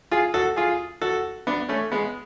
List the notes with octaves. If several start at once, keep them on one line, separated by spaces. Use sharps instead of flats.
F4 G#4
F#4 A4
F4 G#4
F#4 A4
B3 D4
A3 C#4
G#3 B3